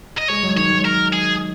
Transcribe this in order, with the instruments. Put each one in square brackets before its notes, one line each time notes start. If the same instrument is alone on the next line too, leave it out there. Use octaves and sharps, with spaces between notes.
[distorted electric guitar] D#5
[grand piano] G#3 [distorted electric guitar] C#5
[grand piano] F#3
[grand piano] D#3 [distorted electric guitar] C#5
[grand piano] F#3
[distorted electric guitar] A#4
G#4